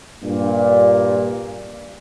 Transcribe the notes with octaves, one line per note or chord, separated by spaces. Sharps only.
G2 A#2